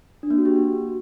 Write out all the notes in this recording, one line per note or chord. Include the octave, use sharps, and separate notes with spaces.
D4
A#3
F#4
G4